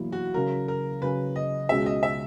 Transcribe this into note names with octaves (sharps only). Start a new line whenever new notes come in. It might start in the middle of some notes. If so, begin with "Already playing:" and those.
Already playing: E2 B2 F#3 A#3 E4
F#4
C#3 F#3 C#4 A#4
A#4
C#3 F#3 C#4 B4
D#5
C#2 B2 G#3 C#4 G#4 E5
D#5
E5